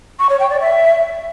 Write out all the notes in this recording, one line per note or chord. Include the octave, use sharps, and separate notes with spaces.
C#6
C#5
G5
D5
E5